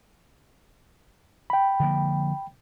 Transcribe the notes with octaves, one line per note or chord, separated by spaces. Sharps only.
G5 B5
D3 F3 A#3